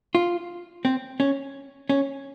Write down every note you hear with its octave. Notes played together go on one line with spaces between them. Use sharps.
F4
C4
C#4
C#4